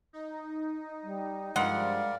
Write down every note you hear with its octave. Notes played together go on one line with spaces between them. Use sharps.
D#4
G3
G2 F3 G3 G#3 A#4 D5 F5 F#5